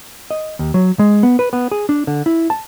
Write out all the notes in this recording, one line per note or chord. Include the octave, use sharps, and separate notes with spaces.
D#5
D#2
F#3
G#3
B3
B4
B3
G#4
D4
D3
E4
A5